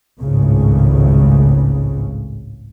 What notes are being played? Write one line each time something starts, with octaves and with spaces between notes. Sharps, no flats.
G#1 C#2 A2 C#3